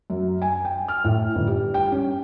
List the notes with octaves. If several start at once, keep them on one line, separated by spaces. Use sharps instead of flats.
F#2
G#5
G5
F6
A2
G1
G3
G5
C#4